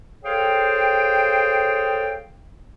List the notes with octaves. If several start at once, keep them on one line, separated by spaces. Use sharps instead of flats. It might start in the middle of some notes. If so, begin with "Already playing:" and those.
G#4 A4 C5 C#5 F5 G5